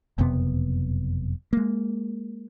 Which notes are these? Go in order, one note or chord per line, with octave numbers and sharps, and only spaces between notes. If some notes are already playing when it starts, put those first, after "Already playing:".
F#1 F2 C3 B3
G#3 A#3